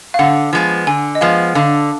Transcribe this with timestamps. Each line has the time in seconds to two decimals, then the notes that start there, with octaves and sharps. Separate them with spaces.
0.14 F5
0.19 D3 F#5
0.53 F3 G#3 B3
0.87 D3 G#5
1.15 D#5
1.21 F3 G#3 B3 F5
1.55 D3 F5